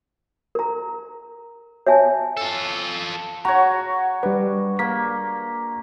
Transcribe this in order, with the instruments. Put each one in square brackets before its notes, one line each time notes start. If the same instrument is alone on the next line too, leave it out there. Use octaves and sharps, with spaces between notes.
[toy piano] A#4 A#5
C#5 E5 G#5 A5
[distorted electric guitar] F4 A4
[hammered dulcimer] F#4 C#5 [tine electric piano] A#5
[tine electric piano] G3 B4 [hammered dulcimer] D4
[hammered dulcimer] A#3 [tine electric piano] B6